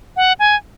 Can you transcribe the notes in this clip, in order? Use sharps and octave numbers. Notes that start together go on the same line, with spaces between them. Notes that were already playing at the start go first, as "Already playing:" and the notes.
F#5
G#5